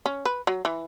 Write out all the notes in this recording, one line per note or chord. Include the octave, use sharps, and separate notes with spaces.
C#4
B4
F#3
E3